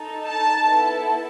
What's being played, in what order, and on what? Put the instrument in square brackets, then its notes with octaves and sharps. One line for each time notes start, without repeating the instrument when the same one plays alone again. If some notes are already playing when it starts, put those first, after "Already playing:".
Already playing: [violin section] D#4 A4
A5
B3 E4 A4